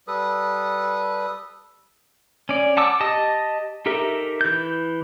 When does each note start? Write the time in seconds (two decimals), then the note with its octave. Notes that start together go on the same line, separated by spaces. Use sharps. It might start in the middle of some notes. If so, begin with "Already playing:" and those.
0.07 G3 A4 B4 D#6
2.49 C#4 D5
2.77 F#5 A5 D6 E6
3.00 G4 D#5 A5 D#6
3.86 D#4 G4 A4 A#4 E5
4.41 E3 G6